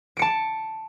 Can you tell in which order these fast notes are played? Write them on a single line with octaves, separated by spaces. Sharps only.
D7 C#7 A5